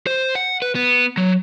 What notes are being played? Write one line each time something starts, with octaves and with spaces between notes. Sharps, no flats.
C5
F#5
B4
B3
F#3